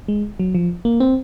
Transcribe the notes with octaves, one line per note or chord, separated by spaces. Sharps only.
G#3
F#3
F3
A#3
C4